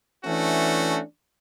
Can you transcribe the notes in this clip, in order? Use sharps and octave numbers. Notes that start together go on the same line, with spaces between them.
E3 A3 C#4 D4 F#4